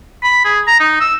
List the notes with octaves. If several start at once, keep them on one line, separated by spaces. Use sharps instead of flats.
B5
G#4
A#5
D#4
E6